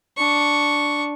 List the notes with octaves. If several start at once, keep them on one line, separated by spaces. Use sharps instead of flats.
D4 C#6